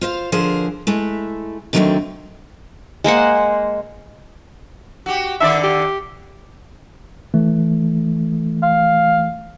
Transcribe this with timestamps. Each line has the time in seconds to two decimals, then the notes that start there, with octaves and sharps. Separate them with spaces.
0.01 F4 C5 F5
0.32 D3 F3 G#4 A#4 C5
0.87 G#3 A3 E4
1.73 D3 D#3 F#3 G3 A3 C4
3.04 G#3 A#3 C5 F#5
5.06 F#4 G4
5.40 D3 D#3 D5 E5
5.63 G4
7.34 E3 A3
8.63 F5